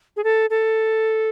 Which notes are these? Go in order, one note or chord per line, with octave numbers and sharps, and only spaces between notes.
G#4
A4
A4